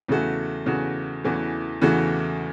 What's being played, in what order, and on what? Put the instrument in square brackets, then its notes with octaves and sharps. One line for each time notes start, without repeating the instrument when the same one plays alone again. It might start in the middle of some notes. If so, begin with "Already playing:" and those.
[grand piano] E2 C#3 A3 F#4
E2 C#3 A3 F#4
E2 C#3 E3 A3 F#4
E2 C#3 E3 A3 F#4